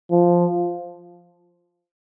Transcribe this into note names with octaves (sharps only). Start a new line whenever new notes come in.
F3